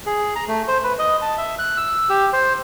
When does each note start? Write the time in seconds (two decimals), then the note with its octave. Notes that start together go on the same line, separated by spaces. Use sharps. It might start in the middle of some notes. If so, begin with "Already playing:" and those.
0.06 G#4
0.36 A#5
0.48 A3
0.68 C5
0.84 B4
0.99 D#5
1.22 A5
1.38 E5
1.59 F#6
1.77 E6
2.09 G4
2.33 C5